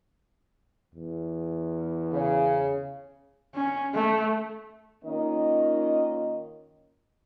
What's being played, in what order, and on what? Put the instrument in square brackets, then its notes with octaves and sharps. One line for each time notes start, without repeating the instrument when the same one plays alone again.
[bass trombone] E2
[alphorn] C#3
[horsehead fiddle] C#4
A3
[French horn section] D#3 A#3 C#4 D#4 F4 D#5